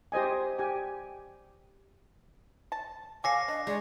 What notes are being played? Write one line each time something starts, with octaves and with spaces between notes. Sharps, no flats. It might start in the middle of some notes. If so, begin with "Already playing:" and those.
G4 C5 D#5 G#5
G4 G#5
A5
A4 C#5 F5 G#5 D6 A#6 C7
D4 D#5
G#3 C#5 D5